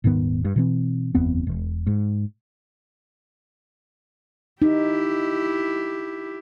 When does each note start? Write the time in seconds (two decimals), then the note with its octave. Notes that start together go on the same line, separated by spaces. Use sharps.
0.04 D#1 G#2 D#3 B3
0.45 G2
0.56 B2 E3 C4
1.15 F#1 E2 B3 C4
1.47 E1
1.87 G#2
4.62 D#4 E4 G4